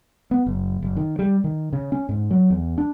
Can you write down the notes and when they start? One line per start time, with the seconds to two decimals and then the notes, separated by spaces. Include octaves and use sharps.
0.31 B3
0.46 F#1
0.83 F#1
0.96 D#3
1.19 G3
1.44 D#3
1.73 C#3
1.92 C#4
2.09 G#2
2.31 F#3
2.50 E2
2.78 D4